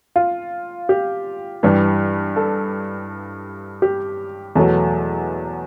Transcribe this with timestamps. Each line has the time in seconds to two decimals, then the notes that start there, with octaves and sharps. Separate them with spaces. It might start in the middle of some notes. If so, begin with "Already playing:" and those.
0.16 F4
0.89 G4
1.63 G2 E3 G3
2.36 A4
3.82 G4
4.55 E2 B2 F#3 A3